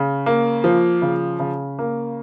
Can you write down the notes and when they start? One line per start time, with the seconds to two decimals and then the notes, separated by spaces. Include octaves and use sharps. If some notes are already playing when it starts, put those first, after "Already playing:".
Already playing: C#3
0.26 A#3
0.64 F3
1.02 C#3
1.40 C#3
1.79 A#3